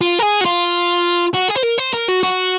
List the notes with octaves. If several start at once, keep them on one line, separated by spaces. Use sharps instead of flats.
F4
A#4
G#4
F#4
F4
F#4
G#4
C5
A#4
C5
A#4
F#4
F#4